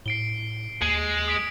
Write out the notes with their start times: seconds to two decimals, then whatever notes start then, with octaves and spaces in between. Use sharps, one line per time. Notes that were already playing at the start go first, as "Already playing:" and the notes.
0.06 A2 C7 D7 G7
0.82 D#2 G#3 F#7
1.28 D#6 B6 D7